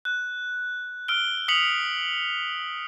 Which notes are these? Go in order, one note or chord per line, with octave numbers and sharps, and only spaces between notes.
F#6
E6 F6 D7 G7
D#6 B6 C#7 F7 F#7